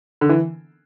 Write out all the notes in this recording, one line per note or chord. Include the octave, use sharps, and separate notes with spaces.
D3
E3